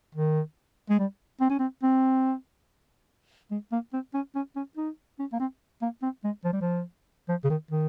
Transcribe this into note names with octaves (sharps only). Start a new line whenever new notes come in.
D#3
G#3
G3
C4
C#4
C4
C4
G#3
A#3
C4
C#4
C#4
C#4
D#4
C#4
A#3
C4
A#3
C4
G#3
F3
G3
F3
F3
C#3
D#3
D#3